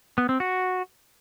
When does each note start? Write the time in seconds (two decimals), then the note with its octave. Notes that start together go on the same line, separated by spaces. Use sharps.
0.18 B3
0.29 C4
0.40 F#4